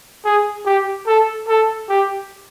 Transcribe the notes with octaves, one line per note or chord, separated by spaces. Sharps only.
G#4
G4
A4
A4
G4